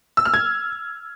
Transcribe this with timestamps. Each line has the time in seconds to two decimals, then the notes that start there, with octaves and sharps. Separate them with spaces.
0.17 E6
0.25 F6
0.34 G#6